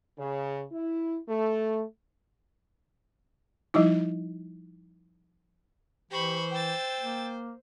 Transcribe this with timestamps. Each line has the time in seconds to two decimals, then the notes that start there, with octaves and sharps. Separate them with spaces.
0.19 C#3
0.72 E4
1.29 A3
3.74 F3 G3 D#4 E4
6.11 E3 G4 C5 B5 C#6
6.52 G5 E6 A6
7.00 A#3